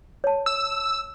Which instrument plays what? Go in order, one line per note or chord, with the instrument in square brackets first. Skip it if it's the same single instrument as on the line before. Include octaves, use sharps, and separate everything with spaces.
[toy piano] C#5 A5
[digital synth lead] E6